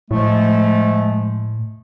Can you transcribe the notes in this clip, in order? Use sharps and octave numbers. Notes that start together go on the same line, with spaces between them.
A2 F3 G#3 A3